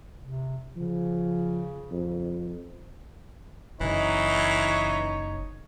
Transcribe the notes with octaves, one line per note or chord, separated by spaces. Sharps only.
C3
C#3 F3
F2
F#1 C#3 E3 D#4 C#5